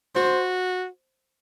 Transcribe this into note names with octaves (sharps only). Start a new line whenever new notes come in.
F#4 C5